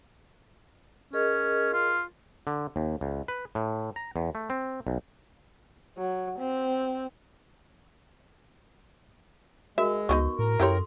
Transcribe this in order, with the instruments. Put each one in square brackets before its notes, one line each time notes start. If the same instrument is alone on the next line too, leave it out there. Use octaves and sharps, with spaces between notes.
[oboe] C#4 [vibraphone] G#4 A#4 D#5
[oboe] F4
[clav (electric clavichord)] D3
D#2
C#2
B4
A2
A#5
E2
A3
C4
B1
[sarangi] F#3
C4
[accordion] G#3 [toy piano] F#4 A#4 [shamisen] E5
[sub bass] C#2 [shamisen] B3 D4 D#4 [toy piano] F#4 C#6
[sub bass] A2 [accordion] A#4
[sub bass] F#2 [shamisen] E4 G4 C#5 [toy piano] A4 C6